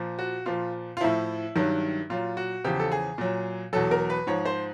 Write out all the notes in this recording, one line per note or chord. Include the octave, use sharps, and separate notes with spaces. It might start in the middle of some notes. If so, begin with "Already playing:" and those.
Already playing: A#2 F3
F#4
A#2 F3 F4
F4
A2 F3 E4
G2 D#3 F#3
A#2 F#3 F4
F#4
E2 C#3 F3 G4
A4
G#4
A#2 F#3
E2 B2 F#3 A4
A#4
B4
G#2 F3 C#5
C5